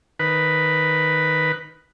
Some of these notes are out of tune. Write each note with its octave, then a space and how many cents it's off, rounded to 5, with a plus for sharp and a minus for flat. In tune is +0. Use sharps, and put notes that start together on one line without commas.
D#3 +0 B4 +0